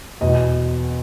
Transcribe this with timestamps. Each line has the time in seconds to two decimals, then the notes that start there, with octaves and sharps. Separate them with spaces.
0.21 E2 B2 D#5